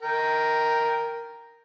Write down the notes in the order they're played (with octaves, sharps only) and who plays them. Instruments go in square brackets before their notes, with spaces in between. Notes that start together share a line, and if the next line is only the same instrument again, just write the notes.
[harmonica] A#4 G5 A#5